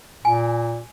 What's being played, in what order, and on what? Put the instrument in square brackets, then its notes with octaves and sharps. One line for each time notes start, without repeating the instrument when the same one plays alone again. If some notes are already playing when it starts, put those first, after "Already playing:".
[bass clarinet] A#2 [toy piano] G#5